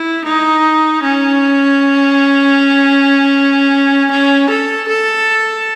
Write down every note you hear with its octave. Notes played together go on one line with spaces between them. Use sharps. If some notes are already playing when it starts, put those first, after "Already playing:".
Already playing: E4
D#4
C#4
C#4
A4
A4